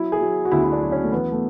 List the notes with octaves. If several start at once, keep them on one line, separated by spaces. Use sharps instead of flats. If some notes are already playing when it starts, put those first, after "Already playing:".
Already playing: F#3 E4
G#4
F#3
F#4
D2 E4
E4
D4
F#3
C#4
A3
E3 B3
A3